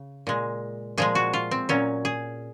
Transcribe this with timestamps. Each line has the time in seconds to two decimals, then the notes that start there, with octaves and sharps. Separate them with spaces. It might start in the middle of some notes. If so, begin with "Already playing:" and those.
Already playing: C#3
0.27 A#2 G#3
0.98 A#2 F3 G#3 G#4
1.15 F#4
1.33 F4
1.51 C4
1.69 A#2 F#3 C#4
2.05 G#4